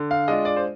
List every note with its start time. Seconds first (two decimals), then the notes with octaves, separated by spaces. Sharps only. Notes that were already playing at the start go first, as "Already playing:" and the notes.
Already playing: D3
0.11 F5
0.28 G#3 D4 F4 D#5
0.45 D5
0.56 C5